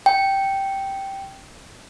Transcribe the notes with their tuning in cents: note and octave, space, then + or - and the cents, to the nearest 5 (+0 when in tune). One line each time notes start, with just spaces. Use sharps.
G5 -5